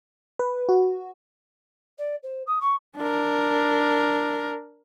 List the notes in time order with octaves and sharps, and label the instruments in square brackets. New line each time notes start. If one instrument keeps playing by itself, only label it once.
[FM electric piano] B4
F#4
[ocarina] D5
C5
D#6
C#6
[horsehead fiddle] D4 A#4